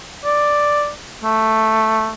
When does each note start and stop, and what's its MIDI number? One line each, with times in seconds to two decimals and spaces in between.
0.25 0.90 74
1.24 2.12 57